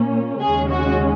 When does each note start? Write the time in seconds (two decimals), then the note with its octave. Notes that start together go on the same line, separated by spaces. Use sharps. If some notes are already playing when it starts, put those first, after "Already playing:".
Already playing: A#2 A#3 C#4
0.40 D#2 C#3 G#3 C#4 G#4
0.71 F#4